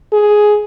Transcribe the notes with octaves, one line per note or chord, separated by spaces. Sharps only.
G#4